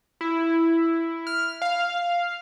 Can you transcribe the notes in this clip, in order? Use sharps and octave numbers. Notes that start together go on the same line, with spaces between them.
E4
F6
F5